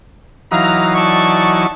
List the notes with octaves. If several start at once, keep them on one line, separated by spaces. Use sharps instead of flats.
E3 F#3 D#4 F5 A#5
D5 A5 C#6